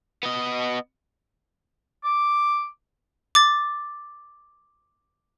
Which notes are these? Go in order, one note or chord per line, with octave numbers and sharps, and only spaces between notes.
B3 D#5
D6
D6 A6